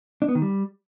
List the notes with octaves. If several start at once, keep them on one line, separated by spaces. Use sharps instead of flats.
D4
B3
D#3
G3